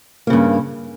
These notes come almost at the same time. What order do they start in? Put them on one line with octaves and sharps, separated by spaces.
A#3 C#3 G2